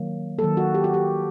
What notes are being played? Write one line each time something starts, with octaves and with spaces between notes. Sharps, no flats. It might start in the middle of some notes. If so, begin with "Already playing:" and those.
Already playing: D#3 F#3 A#3
D#3 F#3 A#3 A4
F#4
G4
F#4
G4